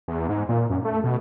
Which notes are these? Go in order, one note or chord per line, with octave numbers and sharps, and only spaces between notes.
E2
G#2
A#2
F#2
A3
B2